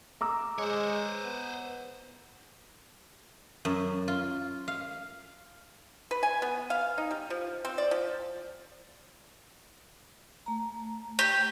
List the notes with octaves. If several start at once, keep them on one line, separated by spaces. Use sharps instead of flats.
A#5 D6 E6
G#3 C5 C#5
B3
F#2
F4
F5
B4
G#5
B3
F5
D#4
G3
F3
C4
D5
F3
A3 A#5
G4